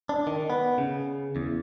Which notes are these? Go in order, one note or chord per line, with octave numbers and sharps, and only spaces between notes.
D4
D#3
B3
C#3
E2